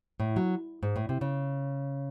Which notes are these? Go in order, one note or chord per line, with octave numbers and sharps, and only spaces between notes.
A2
F#3
G#2
A2
C3
C#3